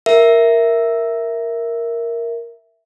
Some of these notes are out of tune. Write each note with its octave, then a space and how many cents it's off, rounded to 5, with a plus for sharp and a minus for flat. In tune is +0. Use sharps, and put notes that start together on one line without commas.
A#4 +0 E5 +0